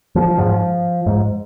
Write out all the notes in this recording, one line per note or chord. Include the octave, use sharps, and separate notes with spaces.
F3
G#2 F3
G#2